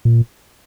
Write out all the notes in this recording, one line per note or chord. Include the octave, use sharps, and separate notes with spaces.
A#2